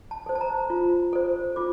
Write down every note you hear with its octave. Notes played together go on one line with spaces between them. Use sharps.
A5
A4 C5
A5
A#5
F4
A4 C5
F4 D6